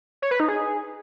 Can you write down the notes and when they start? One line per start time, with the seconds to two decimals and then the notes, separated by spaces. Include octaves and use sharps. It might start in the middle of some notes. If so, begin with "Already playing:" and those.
0.22 C#5
0.31 B4
0.40 D#4
0.48 G#4